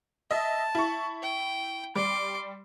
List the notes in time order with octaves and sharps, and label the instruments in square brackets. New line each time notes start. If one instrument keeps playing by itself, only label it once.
[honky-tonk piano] D#5 E5 [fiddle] A5
[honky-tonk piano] E4 C#6
[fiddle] G5
[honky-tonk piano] G3 [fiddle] C6 D6